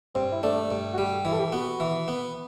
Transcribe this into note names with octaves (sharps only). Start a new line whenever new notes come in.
G2 C4
E4
A3 D4
G2
F#4
G3 G4
E3 E4
A4
G4
B3 F#4
E3
B3